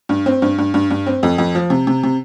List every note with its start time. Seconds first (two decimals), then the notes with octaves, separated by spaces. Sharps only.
0.09 G2
0.26 C4
0.42 G2
0.58 G2
0.74 G2
0.90 G2
1.06 C4
1.23 F2
1.38 F2
1.55 F3
1.70 C3
1.87 C3
2.03 C3